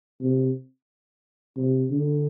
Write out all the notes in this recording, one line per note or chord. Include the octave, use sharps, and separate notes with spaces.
C3
C3
D3